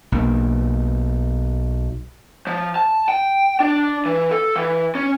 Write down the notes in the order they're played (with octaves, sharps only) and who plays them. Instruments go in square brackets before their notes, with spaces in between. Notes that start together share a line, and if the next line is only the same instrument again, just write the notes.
[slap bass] B1 A#3
[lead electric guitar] F3
A5
G5
D4
E3
A4
E3
C#4